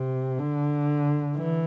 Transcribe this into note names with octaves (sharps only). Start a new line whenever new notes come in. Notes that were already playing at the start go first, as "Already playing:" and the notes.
Already playing: C3
D3
E3